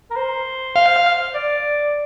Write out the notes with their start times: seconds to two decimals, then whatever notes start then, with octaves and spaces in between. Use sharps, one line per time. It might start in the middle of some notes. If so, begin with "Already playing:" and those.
0.11 A#4
0.16 C5
0.76 F5
1.35 D5